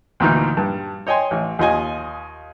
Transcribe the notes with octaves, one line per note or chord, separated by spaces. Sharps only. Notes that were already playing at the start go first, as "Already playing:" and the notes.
D2 A#2 D#3 E3 D#4 F6
G2
C#5 D#5 G5 G#5 C6
A1
D#2 F4 D#5 G#5